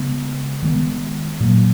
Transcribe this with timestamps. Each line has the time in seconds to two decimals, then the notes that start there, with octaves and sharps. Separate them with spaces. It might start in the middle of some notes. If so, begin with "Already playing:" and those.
Already playing: C#3 G#3 B3
0.63 D#3 G#3 B3
1.40 A#2 F#3 A#3